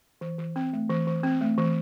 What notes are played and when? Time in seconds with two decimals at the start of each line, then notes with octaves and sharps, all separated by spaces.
0.21 E3
0.38 E3
0.56 C4
0.73 A3
0.90 E3
1.07 E3
1.23 C4
1.41 A3
1.58 E3